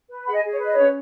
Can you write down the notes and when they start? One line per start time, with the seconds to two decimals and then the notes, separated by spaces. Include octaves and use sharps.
0.09 B4
0.26 G#4 F#5 B5
0.34 D#5 G#5
0.43 G#4
0.51 C#5
0.59 B4 D#5
0.73 C#4 C#5